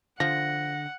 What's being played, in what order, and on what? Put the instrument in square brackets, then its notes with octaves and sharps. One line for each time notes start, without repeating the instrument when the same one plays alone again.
[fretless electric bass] D3 [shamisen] F3 [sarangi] F#5 [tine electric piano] A#6